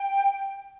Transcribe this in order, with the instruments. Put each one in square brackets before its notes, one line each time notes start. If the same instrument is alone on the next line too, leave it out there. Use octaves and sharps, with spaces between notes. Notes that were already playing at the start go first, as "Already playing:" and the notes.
Already playing: [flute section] G5